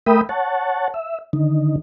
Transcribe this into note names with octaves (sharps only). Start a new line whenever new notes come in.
A3 A#4 E5 G5 B5 D#6
C#5 F#5 A5
E5
D3 D#3 D#4